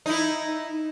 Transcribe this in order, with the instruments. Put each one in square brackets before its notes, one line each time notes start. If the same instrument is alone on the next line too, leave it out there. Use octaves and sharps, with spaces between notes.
[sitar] D#4 E4